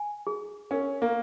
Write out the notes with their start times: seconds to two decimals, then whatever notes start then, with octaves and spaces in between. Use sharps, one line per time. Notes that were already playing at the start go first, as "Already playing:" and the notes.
Already playing: G#5
0.27 G#4
0.71 C#4 A#4
1.02 A#3